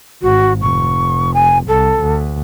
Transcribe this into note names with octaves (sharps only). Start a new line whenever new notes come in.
G#1 F#4
F1 C#6
G#5
C2 A4
D2